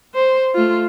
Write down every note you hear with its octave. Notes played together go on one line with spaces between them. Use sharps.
C5
A3 F4